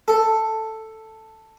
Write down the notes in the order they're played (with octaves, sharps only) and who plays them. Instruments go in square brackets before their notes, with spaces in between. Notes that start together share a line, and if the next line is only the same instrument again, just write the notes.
[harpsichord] A4